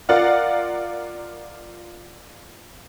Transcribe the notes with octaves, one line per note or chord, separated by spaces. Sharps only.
F4 A#4 D5 F5 F#5